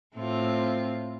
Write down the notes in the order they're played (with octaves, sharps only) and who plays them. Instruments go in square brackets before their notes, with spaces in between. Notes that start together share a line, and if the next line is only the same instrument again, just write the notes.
[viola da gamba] A2 C4 F4